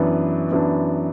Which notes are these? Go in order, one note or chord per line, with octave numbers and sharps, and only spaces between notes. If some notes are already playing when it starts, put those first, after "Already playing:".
Already playing: F#2 E3 B3 D4
F#2 E3 B3 D4